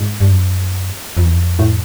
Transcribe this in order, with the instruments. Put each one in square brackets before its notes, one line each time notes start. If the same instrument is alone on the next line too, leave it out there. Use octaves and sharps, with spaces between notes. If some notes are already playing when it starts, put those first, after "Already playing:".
Already playing: [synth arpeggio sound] G#2 G#3
[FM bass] G2
F#2
F2
E2
F2
[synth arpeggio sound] A2 A3